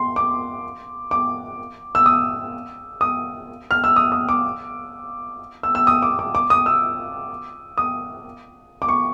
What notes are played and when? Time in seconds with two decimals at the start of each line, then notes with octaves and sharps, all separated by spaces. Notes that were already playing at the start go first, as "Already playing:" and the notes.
Already playing: C6
0.16 D6
1.11 D6
1.95 E6
2.06 D#6
3.01 D#6
3.71 F6
3.84 E6
3.96 D#6
4.12 D#6
4.29 D6
5.63 E6
5.75 E6
5.87 D#6
6.02 D6
6.19 D6
6.35 D6
6.50 D#6
6.66 E6
7.78 D#6
8.82 D6
8.89 C#6